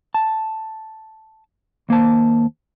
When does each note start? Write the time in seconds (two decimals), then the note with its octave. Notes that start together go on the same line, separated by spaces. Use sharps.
0.14 A5
1.89 D#2 A#3 C5 A5